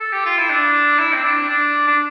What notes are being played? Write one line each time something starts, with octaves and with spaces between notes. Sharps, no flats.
A4
G4
F4
E4
D4
E4
C4
D4
D4
D4